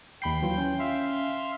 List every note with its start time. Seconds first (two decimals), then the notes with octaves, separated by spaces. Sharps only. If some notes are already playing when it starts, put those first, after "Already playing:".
0.22 D#2 G5 B5 G6 C7
0.42 E3 F#3 F4
0.58 C#4
0.79 E5 F5 C6